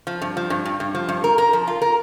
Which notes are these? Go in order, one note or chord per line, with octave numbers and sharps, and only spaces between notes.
F3
G2
F3
G2
G2
G2
F3
G2
A#4
A#4
F3
F4
A#4